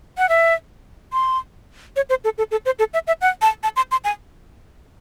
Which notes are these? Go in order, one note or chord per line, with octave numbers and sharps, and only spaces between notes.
F#5
E5
C6
C#5
C5
A4
A4
A4
C5
A4
E5
E5
F#5
A5
A5
C6
C6
G#5